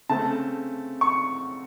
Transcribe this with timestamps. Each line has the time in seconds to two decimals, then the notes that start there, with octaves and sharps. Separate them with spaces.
0.09 C#3 A3 C4 A5
1.01 C#6